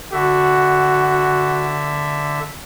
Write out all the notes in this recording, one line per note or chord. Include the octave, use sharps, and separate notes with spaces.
D3 F#4 E5